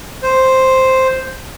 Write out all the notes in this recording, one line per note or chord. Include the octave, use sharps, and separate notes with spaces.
C5